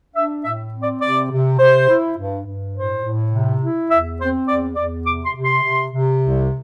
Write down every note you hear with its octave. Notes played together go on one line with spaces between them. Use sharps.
D4 E5
A2 E5
C4
D5
C3 D5
C3
C3 C5
E4
G2
G2
A2 C5
A2
C3
E4
E2 E5
C4 C5
E2 D5
E2 D5
C3 D6
C6
C3
C6
C3
C3
C2